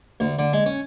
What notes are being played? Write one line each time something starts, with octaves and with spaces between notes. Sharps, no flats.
D2
D3
G#3
C#4